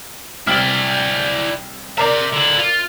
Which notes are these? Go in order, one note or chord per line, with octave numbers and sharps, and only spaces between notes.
C2 E4 D5 F6
A#4 C5 D5 E5
D3 E4
F4